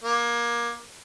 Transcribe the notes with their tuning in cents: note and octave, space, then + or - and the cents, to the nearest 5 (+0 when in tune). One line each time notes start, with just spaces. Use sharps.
A#3 +25